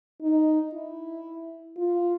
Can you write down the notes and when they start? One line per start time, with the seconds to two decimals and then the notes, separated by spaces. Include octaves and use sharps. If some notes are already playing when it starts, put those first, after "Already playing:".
0.22 D#4
0.74 E4
1.77 F4